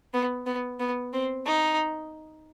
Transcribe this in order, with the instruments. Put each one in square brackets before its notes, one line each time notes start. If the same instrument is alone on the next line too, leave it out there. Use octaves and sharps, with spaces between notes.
[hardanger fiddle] B3
B3
B3
C4
D#4